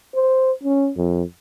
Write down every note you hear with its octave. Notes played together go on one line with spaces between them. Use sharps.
C5
C#4
F2